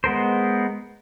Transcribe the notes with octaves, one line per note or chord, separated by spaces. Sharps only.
G#3 B3 A#4 C5